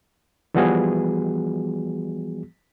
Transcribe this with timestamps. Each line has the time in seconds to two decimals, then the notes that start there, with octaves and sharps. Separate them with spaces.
0.54 E3 F3 G3 B3 F#4 G#4